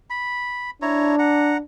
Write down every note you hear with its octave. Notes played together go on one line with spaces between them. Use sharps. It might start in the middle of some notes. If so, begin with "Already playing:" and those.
B5
D4 E4 C#5 A#5
F#5 A#5